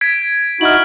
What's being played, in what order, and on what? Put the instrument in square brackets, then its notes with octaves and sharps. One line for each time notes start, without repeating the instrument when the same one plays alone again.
[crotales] G#6 B6 D7
[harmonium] D#4 E4 F#4 [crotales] F6 F#7